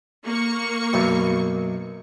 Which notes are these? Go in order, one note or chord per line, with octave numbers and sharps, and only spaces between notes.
A#3 C#6
B1 F#2